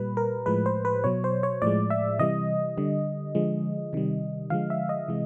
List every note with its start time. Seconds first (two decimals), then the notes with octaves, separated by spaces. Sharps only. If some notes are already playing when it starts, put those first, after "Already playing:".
Already playing: A#2 G3 B4
0.17 A#4
0.46 A2 F3 G#3 B4
0.66 C5
0.85 B4
1.04 B2 F#3 C#5
1.24 C5
1.43 C#5
1.62 A2 F3 G#3 D5
1.90 E5
2.19 C3 E3 G3 D#5
2.77 D3 G3
3.35 D3 F3 G#3
3.93 C3 D#3 G3
4.50 D3 F3 G#3 F5
4.70 E5
4.89 D#5
5.08 C3 E3 G#3